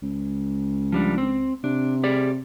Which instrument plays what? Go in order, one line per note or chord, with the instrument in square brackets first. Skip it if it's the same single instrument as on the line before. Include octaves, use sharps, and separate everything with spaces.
[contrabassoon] C#2
[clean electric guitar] F3 G3 D4
C4
[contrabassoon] C3 [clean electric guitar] D4
[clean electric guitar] G4 G#4 D5